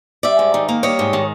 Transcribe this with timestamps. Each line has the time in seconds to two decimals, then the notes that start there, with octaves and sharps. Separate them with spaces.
0.23 G3 D5 E5
0.39 G#2
0.54 D#3
0.69 A#3
0.83 G3 C#5 D#5
0.99 G#2
1.13 D#3